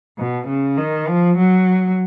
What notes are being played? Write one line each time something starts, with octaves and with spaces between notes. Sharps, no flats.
B2
C#3
D#3
F3
F#3